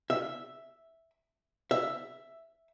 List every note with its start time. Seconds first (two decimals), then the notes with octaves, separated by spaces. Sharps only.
0.10 E5
1.71 E5